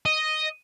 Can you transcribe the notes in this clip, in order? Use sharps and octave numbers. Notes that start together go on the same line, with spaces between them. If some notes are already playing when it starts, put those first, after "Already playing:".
D#5